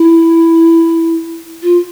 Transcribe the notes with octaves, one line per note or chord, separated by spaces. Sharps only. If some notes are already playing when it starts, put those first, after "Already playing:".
Already playing: E4
F4